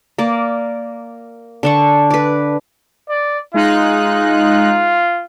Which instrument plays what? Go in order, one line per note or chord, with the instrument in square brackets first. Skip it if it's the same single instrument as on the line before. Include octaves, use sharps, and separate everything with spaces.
[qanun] A#3 D5
D3 D4 C#6
B4 D5
[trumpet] D5
[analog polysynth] G#3 D#4 F#6 [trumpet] F4